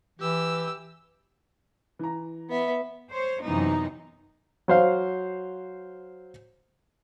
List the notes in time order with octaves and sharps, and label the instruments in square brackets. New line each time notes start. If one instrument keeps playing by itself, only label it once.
[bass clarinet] E3 [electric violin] G4 E6
[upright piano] E3 A#5
[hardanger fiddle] B3 E5
[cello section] C5 C#5
F#2 C3 E3 B3 D#4
[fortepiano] F#3 C5 F5